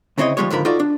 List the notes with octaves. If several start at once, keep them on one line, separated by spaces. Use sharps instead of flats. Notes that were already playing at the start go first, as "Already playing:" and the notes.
D2 C#3 C4 E4 C#5 D#5
D#2 F3 G3 G#3 C#5
D#2 G#2 D3 F3 A#4 B5
D#4 F4 F#4 A4 D5
D4